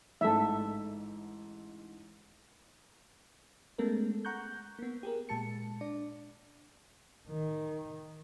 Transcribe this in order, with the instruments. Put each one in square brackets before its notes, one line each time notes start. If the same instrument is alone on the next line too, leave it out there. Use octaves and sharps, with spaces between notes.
[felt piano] A1 G#2 [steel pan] A4 E5
[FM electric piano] G#3 A3 B3 C#4 A4 A#4
F#5 A#5 C#6 F#6 G6
A#3 B3
G4 G#4 A#4
A#2 G#3 A5 C#7
D4 D5
[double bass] D#3